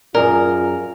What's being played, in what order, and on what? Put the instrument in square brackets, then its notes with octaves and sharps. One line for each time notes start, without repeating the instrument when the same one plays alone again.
[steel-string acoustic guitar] F#2 G#4 A#5 [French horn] F4 [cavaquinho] A#4 [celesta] D5